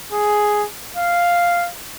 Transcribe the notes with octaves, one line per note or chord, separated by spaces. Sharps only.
G#4
F5